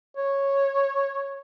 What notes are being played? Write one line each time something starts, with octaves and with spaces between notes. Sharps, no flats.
C#5